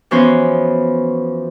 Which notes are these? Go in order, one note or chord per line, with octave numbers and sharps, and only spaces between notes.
E3 F3 B3 C#4 F#4 C5